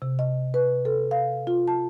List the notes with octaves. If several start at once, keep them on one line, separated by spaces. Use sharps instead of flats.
C3
D#5
B4
A4
F5
F4
A5